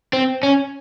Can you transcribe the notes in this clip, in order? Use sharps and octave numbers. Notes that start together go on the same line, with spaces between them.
C4
C#4